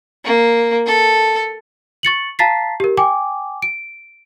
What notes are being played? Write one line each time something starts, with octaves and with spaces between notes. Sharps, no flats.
A#3
A4
C#6 A6 C#7 F#7
F5 A5 A#5 A6 B6 C7
G4 A#4
G5 G#5 D6
D7